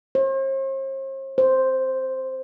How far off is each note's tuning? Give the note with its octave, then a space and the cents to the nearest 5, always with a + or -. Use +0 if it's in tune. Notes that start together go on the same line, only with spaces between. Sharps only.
C5 +45
C5 +0